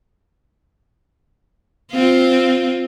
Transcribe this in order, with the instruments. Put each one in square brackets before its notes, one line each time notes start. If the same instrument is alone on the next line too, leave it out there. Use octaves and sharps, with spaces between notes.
[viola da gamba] C4 F4